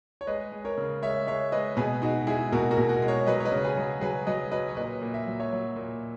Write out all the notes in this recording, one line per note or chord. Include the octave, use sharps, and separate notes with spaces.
C#5
G#3 B4 D#5
G#3
A#4 C#5
C#3
G#3 C#5 E5
G#3 C#5 E5
G#3 B4 D#5
B2 G#4 B4
G#3 D#4 F#4
G#3 E4 G#4
B2 F#4 A#4
F#4 A#4
B2
F#4 A#4
G#3
A#4 C#5
F#3 B4 D#5
C#5
B4 D#5
C#3
G#4 B4
F#3
F#3 G#4 B4
F#3 B4 D#5
F#3 B4 D#5
C#5
A#2 B4 D#5
A#2
E5
F#3
C#5 E5
F#3
A#2